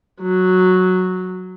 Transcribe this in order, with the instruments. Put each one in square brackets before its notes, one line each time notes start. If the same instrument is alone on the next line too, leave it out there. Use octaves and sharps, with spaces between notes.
[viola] F#3